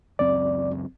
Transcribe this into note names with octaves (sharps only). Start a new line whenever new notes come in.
C#2 F#2 C4 D5